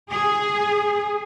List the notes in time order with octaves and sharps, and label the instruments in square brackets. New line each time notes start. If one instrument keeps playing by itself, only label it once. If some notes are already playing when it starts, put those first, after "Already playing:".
[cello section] G#4